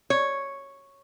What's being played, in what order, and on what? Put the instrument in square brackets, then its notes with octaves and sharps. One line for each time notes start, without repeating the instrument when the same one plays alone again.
[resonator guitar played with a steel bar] C#5